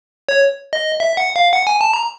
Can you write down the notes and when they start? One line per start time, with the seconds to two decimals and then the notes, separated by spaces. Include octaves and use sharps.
0.29 C#5
0.73 D#5
1.00 E5
1.17 F#5
1.36 F5
1.53 F#5
1.67 G#5
1.81 A5
1.93 A#5